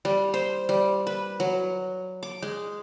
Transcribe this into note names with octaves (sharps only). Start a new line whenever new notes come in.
G3
C5
G3
B4
F#3
D6
G#3